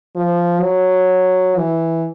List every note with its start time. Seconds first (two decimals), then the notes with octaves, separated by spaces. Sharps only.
0.16 F3
0.62 F#3
1.57 E3